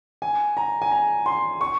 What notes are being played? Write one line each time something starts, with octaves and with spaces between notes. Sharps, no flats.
G#5
A#5
G#5
A#5
C6
C#6